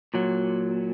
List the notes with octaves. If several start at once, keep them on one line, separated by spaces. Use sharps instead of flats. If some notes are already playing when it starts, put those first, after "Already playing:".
A#2 F#3